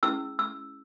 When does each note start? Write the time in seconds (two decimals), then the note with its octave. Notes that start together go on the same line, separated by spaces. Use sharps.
0.03 C#4 E4 G#4 B4 E6
0.39 E6